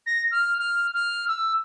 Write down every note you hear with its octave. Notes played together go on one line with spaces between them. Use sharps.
A#6
F6
F6
F6
E6